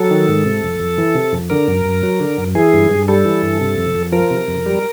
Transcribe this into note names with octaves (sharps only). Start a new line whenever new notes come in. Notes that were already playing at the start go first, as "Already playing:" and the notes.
Already playing: F#3 A4
D#3
G#2
C3
F2
F2
E3
C3
F2
D3 A#4
F#2
F#2
F#3
D3
F#2
E3 G#4
G2
G2
G3 A4
E3
G2
C3
F2
F2
F3 A#4
C3
F2
G3